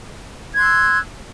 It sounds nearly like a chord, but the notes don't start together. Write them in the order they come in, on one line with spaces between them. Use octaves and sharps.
G#6 C6 F#6 E6